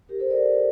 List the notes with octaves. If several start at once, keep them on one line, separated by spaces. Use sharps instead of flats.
G4 A#4
A4 C5
A#4 D5